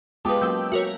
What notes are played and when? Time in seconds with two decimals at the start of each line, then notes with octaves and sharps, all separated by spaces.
0.25 G#3 B3 F4 G4 B4 A5 D#6
0.42 F#3 A#3 C#4 G5 E6 G6
0.72 F#4 A#4 C#5 E5